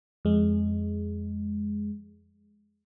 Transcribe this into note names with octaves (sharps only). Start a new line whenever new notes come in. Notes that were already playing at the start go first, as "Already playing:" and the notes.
F2 G#3